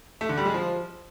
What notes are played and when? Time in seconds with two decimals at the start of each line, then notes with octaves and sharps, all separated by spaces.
0.21 A3
0.29 D3
0.37 G3
0.46 G#3
0.54 F3